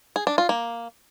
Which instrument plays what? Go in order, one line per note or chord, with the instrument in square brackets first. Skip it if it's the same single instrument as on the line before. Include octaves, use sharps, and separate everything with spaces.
[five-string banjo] G#4
D4
F4
A#3